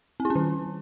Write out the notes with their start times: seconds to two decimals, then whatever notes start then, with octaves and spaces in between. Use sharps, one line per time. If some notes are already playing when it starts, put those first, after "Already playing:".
0.20 C4
0.25 E4
0.30 C#4
0.35 D#3